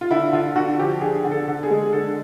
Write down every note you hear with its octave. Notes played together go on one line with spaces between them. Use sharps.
F4
D3 E4
D3 F4
D3 F#4
F3 G4
D3 G#4
D3
A4
D3
G#4
G#3
D3 A4